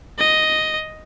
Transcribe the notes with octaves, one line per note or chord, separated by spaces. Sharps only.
D#5